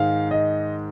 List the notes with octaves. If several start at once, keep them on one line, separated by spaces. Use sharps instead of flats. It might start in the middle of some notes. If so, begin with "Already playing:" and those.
Already playing: G#2 D#3 G#3 F5
D#5